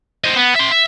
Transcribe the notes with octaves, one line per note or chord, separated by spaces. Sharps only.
C5 D#5
B3
E5 C6
E5